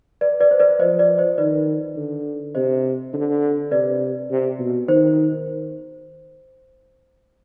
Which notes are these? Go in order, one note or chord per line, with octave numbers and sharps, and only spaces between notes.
B4 D5
B4 D5
C5
B4 D5
F3 C5 D#5
B4 D5
C5 D#5
D#3 B4 D5
D3
C3 C5 D#5
D3
C3 B4 D5
C3
B2
D#3 C5